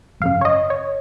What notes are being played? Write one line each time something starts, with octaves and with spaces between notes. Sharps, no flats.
G#1 F#2 C#3 F5
C#5
D#5
C#5